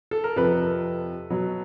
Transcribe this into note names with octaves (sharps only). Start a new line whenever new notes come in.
A4
A#4
F2 C3 F3 A4 B4
B2 F#3 B3